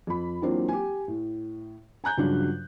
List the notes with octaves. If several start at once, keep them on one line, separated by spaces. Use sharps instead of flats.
F2 B5
E3 F#3 A#3 C4 D4 F4
G4 G#5
A2
G#5 A#5 F#6 G6
G2 C#3 F3 F#3 D4